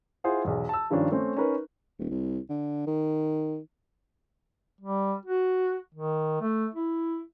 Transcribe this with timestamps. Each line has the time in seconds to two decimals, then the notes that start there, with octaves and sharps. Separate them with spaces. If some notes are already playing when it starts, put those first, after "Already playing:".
0.24 E4 F4 G#4 C5 F#5
0.45 B1 E2
0.69 A5 E6
0.90 G2 D#3 F3 C#4 D4
1.12 A3 C4 C#4
1.37 C#4 D#4 A#4 B4
1.99 D#1
2.10 C2
2.50 D3
2.87 D#3
4.81 G3
5.26 F#4
5.95 D#3
6.41 A3
6.75 E4